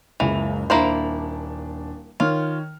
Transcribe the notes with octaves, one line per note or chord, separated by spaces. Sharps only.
F#1 C#2 E3 F7
D#1 A#3 D4 E4 C5 F7
D#3 F4 C#5 F6